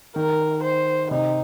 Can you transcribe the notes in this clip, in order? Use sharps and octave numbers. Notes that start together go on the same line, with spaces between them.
D#3 A#4
C5
C3 D#4